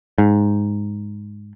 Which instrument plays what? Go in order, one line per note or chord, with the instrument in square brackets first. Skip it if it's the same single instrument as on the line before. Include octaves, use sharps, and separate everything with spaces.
[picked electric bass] G#2